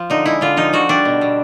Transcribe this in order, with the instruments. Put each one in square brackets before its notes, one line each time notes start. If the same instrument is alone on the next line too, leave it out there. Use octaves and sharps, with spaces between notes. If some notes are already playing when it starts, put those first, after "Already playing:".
Already playing: [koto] F3
D3 D#4
G#3 E4
D3 F4
F3 D#4
D3 F#4
G3 D4
B2
B2